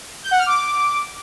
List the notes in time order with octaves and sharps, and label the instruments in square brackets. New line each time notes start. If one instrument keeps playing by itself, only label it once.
[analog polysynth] G6
F#5
F6
D6